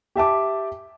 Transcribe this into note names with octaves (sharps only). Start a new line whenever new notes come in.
G4 E5 A5 D6